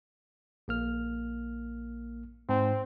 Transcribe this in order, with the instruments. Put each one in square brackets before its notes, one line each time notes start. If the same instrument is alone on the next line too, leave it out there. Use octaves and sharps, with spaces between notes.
[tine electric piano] A#1 A#3 F6
[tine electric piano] G#2 [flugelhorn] C4